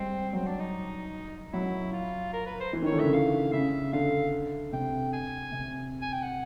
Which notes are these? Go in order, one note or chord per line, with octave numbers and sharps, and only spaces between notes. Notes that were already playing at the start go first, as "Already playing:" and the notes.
Already playing: G3 G#3 C4
F#3 C4
D4
D#4
F#3 E4
F4
A#4
B4
C5
E3
D#3
C#5
D3
C#3 E5
F5
C#3 E5
D3 F5
C3 G5
G#5
C3
G#5
G5
F#5